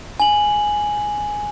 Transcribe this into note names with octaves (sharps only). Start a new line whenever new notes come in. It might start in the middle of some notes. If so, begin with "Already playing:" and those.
G#5 F#7